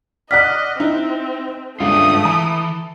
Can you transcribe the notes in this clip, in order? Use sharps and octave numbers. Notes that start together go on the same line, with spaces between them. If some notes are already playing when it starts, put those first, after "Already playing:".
D5 D#5 F#5 F6 F#6 B6
C4 D#4 E4
C#2 G2 A3 D4 F4 D#6
E3 A5 A#5